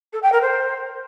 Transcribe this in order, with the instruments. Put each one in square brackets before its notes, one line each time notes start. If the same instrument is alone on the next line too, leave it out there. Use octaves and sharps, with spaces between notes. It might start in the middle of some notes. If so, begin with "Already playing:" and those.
[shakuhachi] A4
G5
A#4
C5